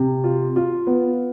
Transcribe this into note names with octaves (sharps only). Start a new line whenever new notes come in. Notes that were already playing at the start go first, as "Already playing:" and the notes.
Already playing: C3
F4
F4
B3